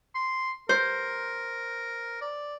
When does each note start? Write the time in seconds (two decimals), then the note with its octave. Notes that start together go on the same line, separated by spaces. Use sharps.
0.15 C6
0.69 A#4 C5
2.21 D5